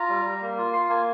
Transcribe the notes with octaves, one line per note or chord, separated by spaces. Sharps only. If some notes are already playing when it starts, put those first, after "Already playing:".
Already playing: F4 A#5
G3
G3
A#3
F4
F4 C6
A#3 G#5